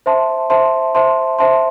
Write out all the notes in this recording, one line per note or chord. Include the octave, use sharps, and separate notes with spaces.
C5 E5 A5 C6
C5 E5 A5 C6
C5 E5 A5 C6
C5 E5 A5 C6